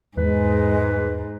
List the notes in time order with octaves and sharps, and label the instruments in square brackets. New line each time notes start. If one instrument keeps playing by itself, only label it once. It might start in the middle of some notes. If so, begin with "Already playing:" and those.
[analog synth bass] E2 [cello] G#2 [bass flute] G#3 [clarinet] B4